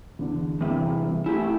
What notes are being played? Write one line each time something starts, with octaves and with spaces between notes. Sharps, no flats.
E2 D3
E2 G2 C3 E4 G#4
A3 E4 G4 G#5